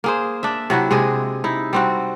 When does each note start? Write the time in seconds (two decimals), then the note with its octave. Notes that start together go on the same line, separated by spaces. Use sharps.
0.04 A#3 G#4 C5
0.43 D4 E5
0.70 C3 F#3 E4 F#4
0.91 C3 G#3 G#4
1.44 D#4 E4
1.73 G3 C4 F#4